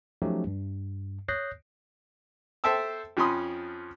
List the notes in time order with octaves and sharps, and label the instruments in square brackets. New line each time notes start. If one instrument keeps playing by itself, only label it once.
[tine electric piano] F3 F#3 A3 C#4 D#4 G4
G2
C#5 D#6 F#6 G6 A#6 C7
[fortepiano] A4 C5 E5 G5 A5 E6
F2 F3 C#4 B5 C6 D#6